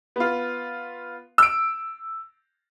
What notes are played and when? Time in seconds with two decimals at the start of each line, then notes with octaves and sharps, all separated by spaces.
0.16 B3 F4
1.38 E6 D7